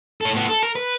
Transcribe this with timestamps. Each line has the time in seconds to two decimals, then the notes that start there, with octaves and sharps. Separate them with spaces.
0.21 A4 C#5
0.33 A2 B3
0.49 A4
0.63 A#4
0.75 B4